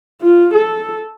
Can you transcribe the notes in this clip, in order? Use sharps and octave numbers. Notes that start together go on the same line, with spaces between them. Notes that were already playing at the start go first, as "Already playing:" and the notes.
F4
A4